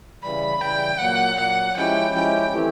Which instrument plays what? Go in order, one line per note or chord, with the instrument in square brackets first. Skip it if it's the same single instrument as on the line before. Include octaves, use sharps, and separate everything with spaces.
[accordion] C#3 E3 G3 [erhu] B5
[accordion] C#3 E3 G3 [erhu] G5
[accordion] A#2 F#3 A#3 [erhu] F#5
[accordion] A#2 F#3 A#3 [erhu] F#5
[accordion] F3 G#3 C#4 E4 G4 [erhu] G5
[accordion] F3 G#3 C#4 E4 G4 [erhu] G5
[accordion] E3 A3 C4 E4 G4